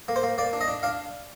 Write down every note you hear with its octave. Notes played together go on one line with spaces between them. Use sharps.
A#3
C5
A#3
A#3 D5
D4
D#5
D4
D4 F5